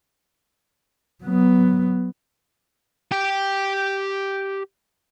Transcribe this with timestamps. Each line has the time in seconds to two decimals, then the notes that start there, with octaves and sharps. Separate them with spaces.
1.24 F#3 B3
3.12 G4 G5